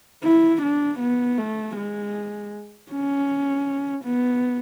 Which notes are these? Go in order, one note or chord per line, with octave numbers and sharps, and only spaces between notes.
E4
D4
B3
A3
G#3
C#4
B3